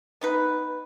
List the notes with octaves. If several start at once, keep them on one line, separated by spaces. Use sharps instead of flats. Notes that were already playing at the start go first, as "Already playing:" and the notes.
B3 D#4 B4